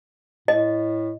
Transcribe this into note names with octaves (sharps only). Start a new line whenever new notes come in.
A2 D#5